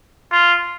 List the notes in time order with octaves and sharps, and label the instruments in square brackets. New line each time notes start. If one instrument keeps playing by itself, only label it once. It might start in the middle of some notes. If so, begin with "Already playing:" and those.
[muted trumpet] F4